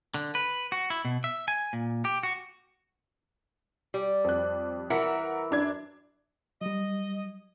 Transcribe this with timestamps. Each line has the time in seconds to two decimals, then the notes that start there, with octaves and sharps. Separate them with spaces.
0.14 D3
0.35 B4
0.72 F#4
0.90 E4
1.05 B2
1.24 E5
1.48 G#5
1.73 A#2
2.05 G4
2.23 F#4
3.94 G3
4.24 F2 F#6
4.90 E3 A#4 E5 F#5 C#7
5.51 F#2 D4 G#6
6.61 F#3 G3 D#5